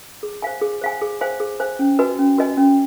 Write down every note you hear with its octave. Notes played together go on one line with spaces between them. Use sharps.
G#4
C5 F5 G#5
G#4
C5 F5 G#5
G#4
C5 F5 G#5
G#4
C5 F5 G#5
C#4
F#4 B4 D#5 G#5
C#4
F#4 B4 D#5 G#5
C#4